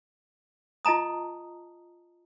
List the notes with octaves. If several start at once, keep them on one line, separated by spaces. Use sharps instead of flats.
F4 D#5 A5 A#5 D#6